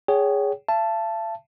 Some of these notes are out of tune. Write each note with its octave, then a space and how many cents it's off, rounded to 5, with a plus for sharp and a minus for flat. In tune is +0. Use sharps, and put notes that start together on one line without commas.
G#4 -10 C#5 +20 G5 -35
E5 +45 A5 +0